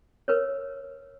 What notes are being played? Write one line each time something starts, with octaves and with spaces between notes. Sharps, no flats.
A#4 B4 C#5